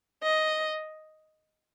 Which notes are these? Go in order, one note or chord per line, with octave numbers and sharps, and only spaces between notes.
D#5